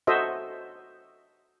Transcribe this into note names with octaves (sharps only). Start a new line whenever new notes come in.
F#4 A4 C5 D#5 E5